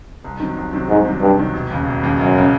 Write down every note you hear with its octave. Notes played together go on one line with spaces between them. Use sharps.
C2
C3 D#3 F#3
C2
C3 D#3 F#3
C2 G#2
C3 D#3 F#3
C2 G2
C3 D#3 F#3
E1
D#2 C#3
E1
D#2 C#3
E1 F#2
C#3